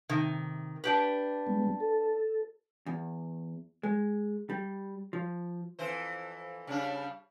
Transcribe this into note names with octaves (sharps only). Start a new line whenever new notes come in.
C3 D#3
D4 G4 B4
G3 G#3 B3
A4
E2
G#3
G3
F3
F2 E3 C5
C#3 G3 D4